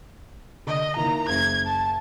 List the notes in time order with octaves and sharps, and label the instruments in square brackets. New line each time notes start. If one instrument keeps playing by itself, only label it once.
[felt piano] D3 [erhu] D#5
[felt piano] E3 A#3 D#4 [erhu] A#5
[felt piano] F#1 [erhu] G#6
[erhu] A5